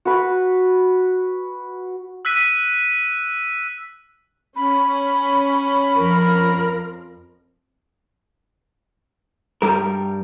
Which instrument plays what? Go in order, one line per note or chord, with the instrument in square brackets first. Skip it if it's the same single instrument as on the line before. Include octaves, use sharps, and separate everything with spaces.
[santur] F#4 B4
[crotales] E6 F#6 B6 D#7
[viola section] C#4 [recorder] B5
[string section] F2 F3 [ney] A#4
[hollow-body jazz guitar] G2 G3 A#4